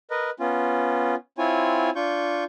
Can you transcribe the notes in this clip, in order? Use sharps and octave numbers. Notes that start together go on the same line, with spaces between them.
A#4 B4 D#5
B3 C#4 F4
C4 E4 F4 C#5 G#5
D4 F4 C#6 G6